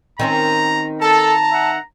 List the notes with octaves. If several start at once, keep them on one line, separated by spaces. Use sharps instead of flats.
D#3 C4 C#4 A#5
A4 A5 A#5
E5 F#5